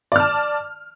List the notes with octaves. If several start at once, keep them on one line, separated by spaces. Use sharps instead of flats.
D5 A5 F6